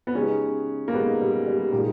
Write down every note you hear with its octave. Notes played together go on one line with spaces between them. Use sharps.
B3
C#3 G#3 C#4 D#4 G4
A#3
C#3 G#3 B3 D#4 G4
G3
G3
A#2 G#3 A#3 D#4 G4